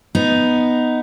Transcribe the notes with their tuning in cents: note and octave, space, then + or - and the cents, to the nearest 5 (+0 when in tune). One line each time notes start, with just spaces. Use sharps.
B3 +0 D#4 +0